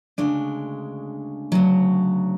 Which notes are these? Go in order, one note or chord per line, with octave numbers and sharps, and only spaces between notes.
D2 C#3 G#3 D4
D2 C#3 F#3